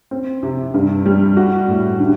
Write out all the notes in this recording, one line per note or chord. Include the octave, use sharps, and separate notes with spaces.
C4
C3
G2
G3
F#4
A2
D3